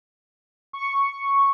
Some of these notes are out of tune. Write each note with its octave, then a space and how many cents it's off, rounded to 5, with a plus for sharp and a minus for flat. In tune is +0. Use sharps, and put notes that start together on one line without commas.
C#6 +0